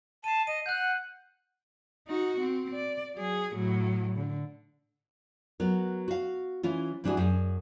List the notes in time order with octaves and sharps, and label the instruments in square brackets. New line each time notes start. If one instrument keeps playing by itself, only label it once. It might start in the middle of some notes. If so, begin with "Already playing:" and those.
[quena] A5 [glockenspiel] C7 D#7
[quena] D#5 [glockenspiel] D#7
[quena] F#5 [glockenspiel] F#6 G6
[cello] D#4 F#4
C4
D5
F#3 G#4
A2 F#3
D3
[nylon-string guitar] F#3 B3 A#4
F#4 F5
E3 C#4 F4
G2 E3 D4 E4 F#4 G#4
F#2 G#4